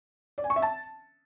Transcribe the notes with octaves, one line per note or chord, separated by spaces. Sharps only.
D5
G#5
C#6
E5
A5